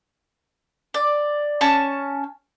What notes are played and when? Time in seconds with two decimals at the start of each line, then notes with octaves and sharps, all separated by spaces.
0.94 D5
1.61 C#4 A5 C#6